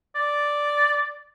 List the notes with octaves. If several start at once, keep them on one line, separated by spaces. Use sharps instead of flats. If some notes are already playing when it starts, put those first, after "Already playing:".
D5